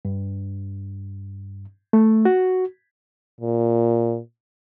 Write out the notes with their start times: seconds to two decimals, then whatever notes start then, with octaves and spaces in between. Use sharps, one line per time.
0.05 G2
1.93 A3
2.25 F#4
3.41 A#2